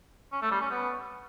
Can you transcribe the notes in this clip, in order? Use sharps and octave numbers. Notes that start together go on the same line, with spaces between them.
C#4
A3
G3
C#4
B3